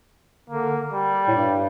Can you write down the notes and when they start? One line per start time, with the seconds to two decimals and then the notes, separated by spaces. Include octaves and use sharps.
0.49 D3 A#3
0.93 G3
1.28 A2
1.36 G2